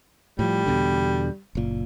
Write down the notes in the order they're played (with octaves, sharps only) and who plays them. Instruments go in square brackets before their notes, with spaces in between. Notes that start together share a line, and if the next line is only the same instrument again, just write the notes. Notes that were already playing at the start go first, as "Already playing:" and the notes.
[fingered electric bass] A2 F3 [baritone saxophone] G3
[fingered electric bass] E2 B2 D3
F#1 A#2